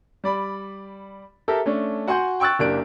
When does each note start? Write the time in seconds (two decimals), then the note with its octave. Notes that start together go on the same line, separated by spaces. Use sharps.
0.24 G3 D5 B5
1.48 G4 A4 A#4 E5
1.66 A3 C#4 D4
2.08 F#4 F#5 G#5 C6 G6
2.40 G5 C#6 E6 F#6 A6
2.59 F#1 A#3 D4 G4 F#6 D7